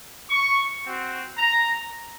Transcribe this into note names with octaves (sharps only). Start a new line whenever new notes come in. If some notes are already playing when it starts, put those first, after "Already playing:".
C#6
C4 F#4
A#5